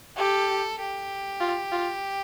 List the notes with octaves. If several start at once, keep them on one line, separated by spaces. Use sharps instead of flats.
G4 A4
G4
F4
F4